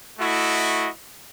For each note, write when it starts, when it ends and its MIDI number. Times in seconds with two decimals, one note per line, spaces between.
0.20 0.89 57
0.20 0.89 64
0.20 0.89 66
0.20 0.89 75